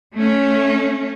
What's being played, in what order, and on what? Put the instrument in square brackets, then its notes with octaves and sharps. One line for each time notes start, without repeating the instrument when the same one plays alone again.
[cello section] A3 C#4